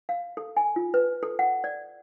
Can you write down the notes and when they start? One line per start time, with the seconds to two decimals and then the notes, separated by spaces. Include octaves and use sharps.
0.09 F5
0.37 A4
0.57 G#5
0.76 F4
0.94 B4
1.23 A4
1.39 F#5
1.64 D5